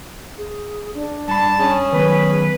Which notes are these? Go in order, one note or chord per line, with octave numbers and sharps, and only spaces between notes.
G#4
D4
G2 A5 B5
C#4 G#4
D#3 F#3 B3 B4